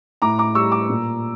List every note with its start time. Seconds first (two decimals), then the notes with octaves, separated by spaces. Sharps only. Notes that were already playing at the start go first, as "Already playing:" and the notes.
0.22 A2 A#5 D6
0.39 A#5 D6
0.55 G3 C#6 E6
0.72 A#5 D6
0.89 A#2